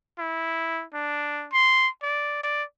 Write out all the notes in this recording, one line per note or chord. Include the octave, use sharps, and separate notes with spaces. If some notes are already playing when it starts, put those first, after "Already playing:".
E4
D4
C6
D5
D5